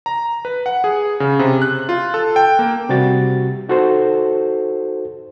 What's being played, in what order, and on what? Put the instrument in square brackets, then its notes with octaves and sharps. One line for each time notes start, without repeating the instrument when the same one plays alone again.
[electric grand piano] A#5
B4
F#5
G#4
C#3
C3
F#6
F4
A4
G5
A#3
[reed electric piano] C3 G3 F#4 A6
D#4 F#4 A4 C5